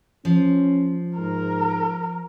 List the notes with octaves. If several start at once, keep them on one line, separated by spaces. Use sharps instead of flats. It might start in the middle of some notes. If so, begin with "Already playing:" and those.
F3 C#4
G#2 A#4